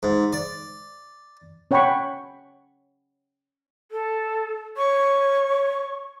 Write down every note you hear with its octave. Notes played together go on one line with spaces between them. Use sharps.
G#2
D5
C#4 C#5 F#5 G5 B5 C#6
A4
C#5 C#6